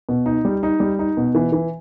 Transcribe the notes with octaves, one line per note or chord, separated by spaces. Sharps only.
B2
D#4
G3
D#4
G3
D#4
B2
E3
E3